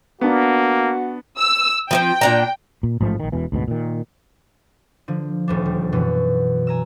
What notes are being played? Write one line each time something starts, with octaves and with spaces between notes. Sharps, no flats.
A#3 B3 D4 F#4
E6
F3 A#3 C4 G5
A#2 D4 A#5
A#2
A1 G#2 F3 A3
A#1 D#3
E1 B2 E3
D2 G#2 B2
A#2 D#3
D3 F3
D#1 D2 D4
G3
F#2 B2 E3
G#5 A#5 E6